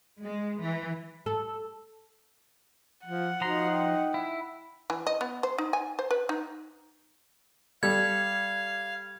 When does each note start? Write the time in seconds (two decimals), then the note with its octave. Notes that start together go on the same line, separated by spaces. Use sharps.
0.22 G#3
0.61 E3
1.26 A4
3.06 F3 F#5
3.41 F3 D#4 F#4 A#5 C6
3.72 G5
4.14 E4
4.90 E3
5.07 D#5
5.21 B3
5.43 C5
5.58 D#4
5.73 G#5
5.99 C5
6.11 B4
6.29 D#4
7.83 G3 A4 F5 G#6